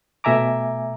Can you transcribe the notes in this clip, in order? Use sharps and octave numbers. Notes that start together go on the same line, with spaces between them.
B2 A3 E5 G#5 A#5 D6